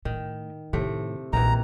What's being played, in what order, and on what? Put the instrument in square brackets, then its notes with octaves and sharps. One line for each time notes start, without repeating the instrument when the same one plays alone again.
[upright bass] A2 [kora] D#3
[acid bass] A2 [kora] C3 A3 [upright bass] D#3
[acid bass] B1 [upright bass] A#2 [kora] D#3 E3 [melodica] A#5